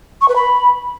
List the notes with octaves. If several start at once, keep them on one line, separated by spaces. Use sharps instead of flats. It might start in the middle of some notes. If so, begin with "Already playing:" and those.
C#6
B4
B5